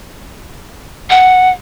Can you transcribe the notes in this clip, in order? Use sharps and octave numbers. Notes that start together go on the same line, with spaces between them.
F#5